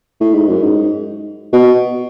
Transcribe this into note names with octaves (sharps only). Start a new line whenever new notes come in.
A2
G#2
F#2
G#2
B2